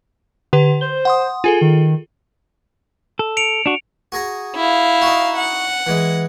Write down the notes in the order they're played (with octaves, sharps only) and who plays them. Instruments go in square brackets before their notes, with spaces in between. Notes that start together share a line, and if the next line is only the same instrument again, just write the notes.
[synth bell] D3 G4 B4
[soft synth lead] C5 [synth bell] G7
[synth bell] F#5 C6 D#6
[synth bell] F4 G#4 A4 [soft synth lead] G#5
[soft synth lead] D#3
[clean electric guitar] A4
[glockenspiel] C#7 D7 F7
[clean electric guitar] D4 F#4
[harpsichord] F#4 G#4 A#5
[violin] E4 F5
[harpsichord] D#4 F#4
[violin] F#5
[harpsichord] E3 G#3